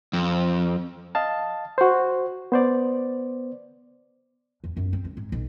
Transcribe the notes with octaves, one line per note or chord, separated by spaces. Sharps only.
F2
D#5 F5 A5
F#4 C5
B3 C5 D5
E2
F#2
C4
C#2
G#2
B1